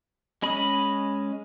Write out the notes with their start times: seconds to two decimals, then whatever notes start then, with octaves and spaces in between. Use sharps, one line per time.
0.42 G#3 C#4 D#5 B5